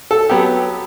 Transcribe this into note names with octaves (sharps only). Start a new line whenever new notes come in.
A4
F#3 B3 G4